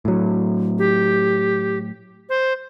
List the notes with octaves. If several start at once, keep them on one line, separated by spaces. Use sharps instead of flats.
A2 F#3
G4
C5